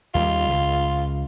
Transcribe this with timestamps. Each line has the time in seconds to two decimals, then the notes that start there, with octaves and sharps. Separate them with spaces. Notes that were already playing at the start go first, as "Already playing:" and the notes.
0.15 D#2 F#3 G3 F4
0.50 C#2